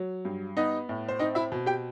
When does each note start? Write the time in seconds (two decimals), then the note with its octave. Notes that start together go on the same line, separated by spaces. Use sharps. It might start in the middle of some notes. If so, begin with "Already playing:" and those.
Already playing: F#3
0.25 G2
0.57 B3 D#4 D#5
0.89 A2
1.08 C5
1.19 C4 D#4 D#5
1.35 E4 E5
1.52 B2
1.66 G4 G5